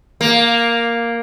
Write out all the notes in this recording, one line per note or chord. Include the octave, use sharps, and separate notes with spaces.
A#3